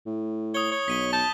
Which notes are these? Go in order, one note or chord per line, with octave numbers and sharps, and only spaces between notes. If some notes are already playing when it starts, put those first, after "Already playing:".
A2
C#5 D#6 G7
C#5
B1 B6 D#7 G7
A5 G6